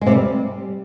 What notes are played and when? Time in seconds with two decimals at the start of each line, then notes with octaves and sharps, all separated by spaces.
0.01 G#3
0.06 C3
0.12 G3